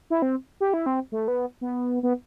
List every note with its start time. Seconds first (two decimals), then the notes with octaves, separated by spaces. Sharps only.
0.10 E4
0.22 C4
0.60 G4
0.74 E4
0.86 C4
1.12 A3
1.28 B3
1.61 B3
2.03 B3